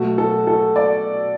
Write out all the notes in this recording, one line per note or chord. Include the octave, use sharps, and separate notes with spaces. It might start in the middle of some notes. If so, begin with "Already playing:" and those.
Already playing: B2 F#3 A3 F#4
A4
A4
D5